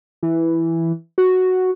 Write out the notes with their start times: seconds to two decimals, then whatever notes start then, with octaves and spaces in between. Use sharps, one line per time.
0.23 E3
1.18 F#4